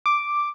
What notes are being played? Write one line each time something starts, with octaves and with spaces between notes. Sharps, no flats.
D6